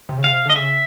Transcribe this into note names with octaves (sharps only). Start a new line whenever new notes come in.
C3
C#3
C3 F5
D3 D#5
C#3 E5